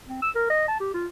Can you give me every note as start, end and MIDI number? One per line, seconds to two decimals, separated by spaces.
0.08 0.22 60
0.22 0.30 88
0.35 0.50 70
0.50 0.66 75
0.68 0.77 81
0.80 0.90 67
0.94 1.07 65